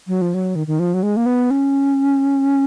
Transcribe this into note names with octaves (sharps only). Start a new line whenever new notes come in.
F#3
F3
F#3
D#3
D#3
F3
F#3
G#3
A#3
B3
C#4